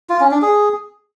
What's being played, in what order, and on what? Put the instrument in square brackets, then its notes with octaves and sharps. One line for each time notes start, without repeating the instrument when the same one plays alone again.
[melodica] F4
C#4
D4
G#4